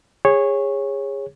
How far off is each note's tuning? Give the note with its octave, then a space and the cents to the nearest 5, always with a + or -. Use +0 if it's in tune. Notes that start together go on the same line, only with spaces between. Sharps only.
G#4 -25 C#5 -10